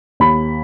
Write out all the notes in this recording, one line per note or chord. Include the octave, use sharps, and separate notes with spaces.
D#2 B5